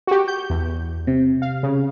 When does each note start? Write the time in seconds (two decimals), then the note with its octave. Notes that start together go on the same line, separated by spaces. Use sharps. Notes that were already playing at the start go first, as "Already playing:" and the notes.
0.07 F#4 G4
0.28 G6
0.50 E2
1.07 C3
1.42 F5
1.63 C#3